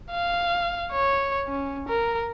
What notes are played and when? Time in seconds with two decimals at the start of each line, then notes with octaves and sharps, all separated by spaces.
0.12 F5
0.92 C#5
1.48 C#4
1.88 A#4